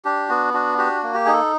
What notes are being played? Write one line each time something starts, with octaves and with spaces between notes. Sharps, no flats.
D4 G4
B3 F#4
D4 F#4
F#4 G4
A#3
G4
D#4 G#4
A4